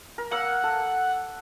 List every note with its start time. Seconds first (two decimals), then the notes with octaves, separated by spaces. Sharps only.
0.18 A#4
0.31 A#3 F#5 E6
0.64 A4